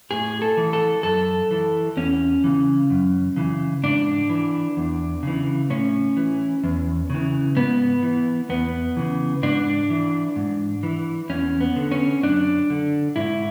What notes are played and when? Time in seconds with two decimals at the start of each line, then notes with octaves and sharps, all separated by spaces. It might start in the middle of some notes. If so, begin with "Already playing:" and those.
0.11 A2 G#4
0.42 A4
0.57 E3
0.73 A4
1.03 F#2 A4
1.51 E3
1.97 E2 C#4
2.44 C#3 E3
2.90 F#2
3.37 C#3 E3
3.83 G#2 D4
4.30 E3
4.77 E2
5.23 C#3 E3
5.70 A2 C#4
6.17 E3
6.64 E2
7.10 C#3 E3
7.56 G#2 B3
8.03 E3
8.49 E2 B3
8.97 C#3 E3
9.42 G#2 D4
9.90 E3
10.36 G#2
10.83 E3
11.29 E2 C#4
11.60 B3
11.76 D3
11.91 C#4
12.23 F#2 D4
12.70 D3
13.16 G#2 E4